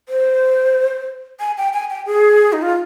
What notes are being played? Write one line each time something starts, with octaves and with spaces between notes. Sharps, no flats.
C5
G#5
G5
G#5
G5
G#4
D#4
F4